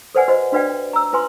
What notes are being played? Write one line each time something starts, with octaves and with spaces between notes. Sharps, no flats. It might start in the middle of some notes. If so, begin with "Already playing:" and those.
A4 B4 C5 D5 F#5 G#5
F#4 C5 D#5
D4 F#4 B4 D5 F5 G5
A#5 E6
F4 B4 G#5 C6